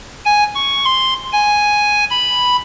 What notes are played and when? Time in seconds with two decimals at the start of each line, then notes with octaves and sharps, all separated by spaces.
0.25 G#5
0.55 C#6
0.85 C6
1.33 G#5
2.10 B5